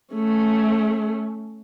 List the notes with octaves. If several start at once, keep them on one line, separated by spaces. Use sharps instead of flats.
A3 C#4